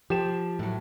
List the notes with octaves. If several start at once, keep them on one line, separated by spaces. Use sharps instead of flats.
F3 G4 E7
A2 F#3